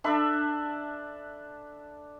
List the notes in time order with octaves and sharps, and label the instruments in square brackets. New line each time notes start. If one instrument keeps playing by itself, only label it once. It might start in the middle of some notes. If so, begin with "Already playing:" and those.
[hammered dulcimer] D4 A4 E5 B5